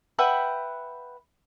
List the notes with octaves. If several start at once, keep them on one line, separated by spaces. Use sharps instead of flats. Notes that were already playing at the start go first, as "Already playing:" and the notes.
B4 E5 F#5 G5